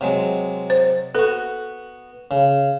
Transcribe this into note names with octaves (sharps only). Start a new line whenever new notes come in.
C3 F#3 G#3
C5
B3 F#4 A4
C#3